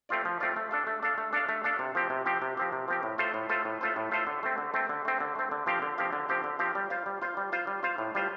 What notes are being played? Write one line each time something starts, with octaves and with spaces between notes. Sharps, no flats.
A3 C4 F4 D5
F3
A3 C4 F4 D5
A3
D4 A4 F5
A3
D4 A4 F5
A3
D4 A4 F5
A3
D4 A4 F5
C3
F3 C4 G4
C3
F3 C4 G4
C3
F3 C4 G4
C3
F3 C4 G4
A2
A3 F4 A4 C5
A2
A3 F4 A4 C5
A2
A3 F4 A4 C5
A2
A3 F4 A4 C5
D3
A3 C4
D3
A3 C4
D3
A3 C4
D3
A3 C4
D3
F3 C4 G4 F5
D3
F3 C4 G4 F5
D3
F3 C4 G4 F5
D3
F3 C4 G4 F5
G3
F4 C5 F5
G3
F4 C5 F5
G3
F4 C5 F5
G3
F4 C5 F5
A2
G3 F4 C5